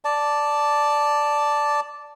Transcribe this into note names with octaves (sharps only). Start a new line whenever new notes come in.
D5 A5